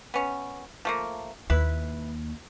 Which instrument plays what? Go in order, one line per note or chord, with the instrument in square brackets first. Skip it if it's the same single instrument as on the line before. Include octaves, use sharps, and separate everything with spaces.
[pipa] B3 C#4
F3 A3 A#3
[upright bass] D#2 [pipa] E4 B4